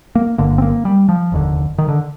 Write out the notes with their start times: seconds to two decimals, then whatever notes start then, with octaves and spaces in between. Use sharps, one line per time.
0.15 A#3
0.38 G1 G2 D3 A#3
0.58 C4
0.62 A#3
0.85 G3
1.09 F3
1.32 F1 D#2 D3
1.78 D#3
1.88 D3